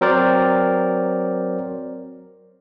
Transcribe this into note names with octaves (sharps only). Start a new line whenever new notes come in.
F#3 C4 A#4 C5 D5